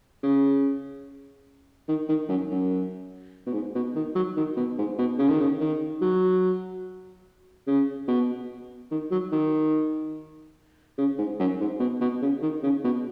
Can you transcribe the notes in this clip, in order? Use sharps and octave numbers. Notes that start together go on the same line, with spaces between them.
C#3
D#3
D#3
F#2
F#2
B2
G#2
B2
D#3
F#3
D#3
B2
G#2
B2
C#3
D#3
C#3
D#3
F#3
C#3
B2
D#3
F#3
D#3
C#3
G#2
F#2
G#2
B2
B2
C#3
D#3
C#3
B2